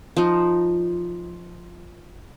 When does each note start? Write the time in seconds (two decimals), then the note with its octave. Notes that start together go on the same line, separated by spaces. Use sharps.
0.17 F3 D#4